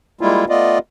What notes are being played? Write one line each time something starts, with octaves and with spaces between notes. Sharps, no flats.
G3 G#3 A#3 E4 F4
A3 B3 F4 D5 D#5